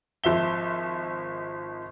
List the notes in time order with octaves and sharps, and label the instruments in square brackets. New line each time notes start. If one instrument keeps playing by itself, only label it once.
[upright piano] G#1 F3 E5 G7